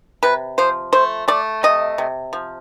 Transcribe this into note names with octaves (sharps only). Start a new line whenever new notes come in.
C3 B4
F3 C5
A3 C5
A3 D5
C3 D#5
C3
F3